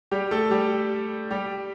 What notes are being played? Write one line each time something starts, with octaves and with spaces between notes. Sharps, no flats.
G3 G4
A3 A4
G3 G4
G3 G4